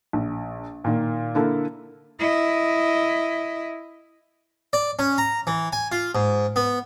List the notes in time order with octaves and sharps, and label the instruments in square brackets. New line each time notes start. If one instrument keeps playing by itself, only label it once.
[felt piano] A#1
A#2 D#3 A#3
D3 A#3 E4 A4
[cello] E4 D#5
[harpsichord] D5
C#4
A#5
E3
G#5
F4
G#2
B3